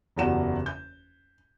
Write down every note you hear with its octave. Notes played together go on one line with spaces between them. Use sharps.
F#1 E2 G3 F#4 E7
G6